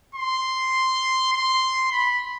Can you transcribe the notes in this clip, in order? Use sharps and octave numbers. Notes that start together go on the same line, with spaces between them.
C6
C6
B5